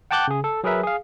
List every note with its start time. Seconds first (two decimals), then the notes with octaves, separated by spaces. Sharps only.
0.11 F#5 G5 A5 D6 F#6 G6
0.28 C#3 G#4
0.44 A4
0.64 F#3 G#4 A#4 B4 E5
0.83 G#4 F5